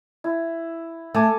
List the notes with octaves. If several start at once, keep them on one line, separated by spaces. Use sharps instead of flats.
E4
A3 A4 G#5 D6